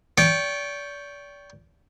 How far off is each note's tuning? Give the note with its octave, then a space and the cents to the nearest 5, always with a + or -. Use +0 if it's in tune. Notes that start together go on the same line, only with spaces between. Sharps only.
D5 -35 G5 +0 C#6 +0